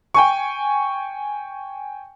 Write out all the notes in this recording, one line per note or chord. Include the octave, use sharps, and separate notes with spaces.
G5 G#5 C#6